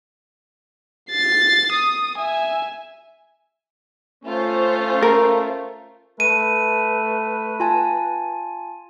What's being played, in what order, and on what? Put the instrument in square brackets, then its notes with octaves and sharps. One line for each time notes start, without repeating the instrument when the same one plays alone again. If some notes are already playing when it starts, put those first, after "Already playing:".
[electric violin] A6 C7
D#6
E5 G#5
[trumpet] A3 [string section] C#4 F4 C5
[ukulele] A#4
[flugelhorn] A3 [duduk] B4 [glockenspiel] D#7
[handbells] F4 G#5 A5